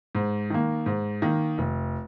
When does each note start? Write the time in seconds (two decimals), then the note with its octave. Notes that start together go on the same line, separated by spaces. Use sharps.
0.15 G#2
0.50 D#3 A#3
0.86 G#2
1.22 D#3 A#3
1.58 F1